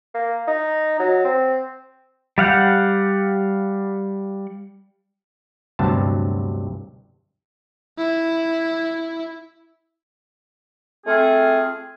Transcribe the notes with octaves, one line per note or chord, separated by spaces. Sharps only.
A#3
D#4
F#3
C4
G3 F5 F#5 G6
D2 G2 C3 F#3 B3 A5
E4
A3 C4 F4 G#4